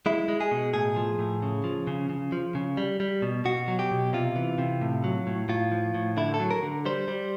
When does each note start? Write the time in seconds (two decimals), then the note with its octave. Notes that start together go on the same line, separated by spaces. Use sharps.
0.06 G#3 E4
0.28 G#3
0.41 G#4
0.51 B2
0.74 A2 G#4
0.96 F3
1.19 A2
1.42 C#3
1.64 F3
1.87 C#3
2.09 C#3
2.32 F3
2.55 C#3
2.77 G3
3.00 G3
3.22 B2
3.45 B2 F#4
3.68 F#3
3.79 G4
3.91 B2
4.13 C3 F4
4.36 E3
4.58 C3
4.81 A2
5.04 F#3
5.27 A2
5.49 A2 F4
5.72 F3
5.94 A2
6.17 D3 E4
6.34 A4
6.40 F#3
6.51 A#4
6.62 D3
6.85 G3 C5
7.08 G3